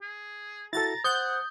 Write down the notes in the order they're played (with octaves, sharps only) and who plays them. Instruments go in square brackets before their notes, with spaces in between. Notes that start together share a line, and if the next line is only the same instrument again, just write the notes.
[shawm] G#4
[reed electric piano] E4 F#4 A4 [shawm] A#5 [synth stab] A6
[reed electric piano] C5 [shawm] F#5 [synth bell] D#6 [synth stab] G6